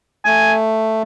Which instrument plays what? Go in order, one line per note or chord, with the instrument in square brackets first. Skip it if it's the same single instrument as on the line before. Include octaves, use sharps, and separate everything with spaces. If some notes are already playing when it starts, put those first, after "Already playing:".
[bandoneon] A3 [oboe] G#5